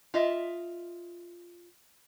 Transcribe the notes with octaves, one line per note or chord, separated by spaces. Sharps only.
F4 D#5 E5